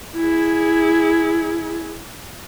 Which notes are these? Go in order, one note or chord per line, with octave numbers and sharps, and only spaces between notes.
E4 G#4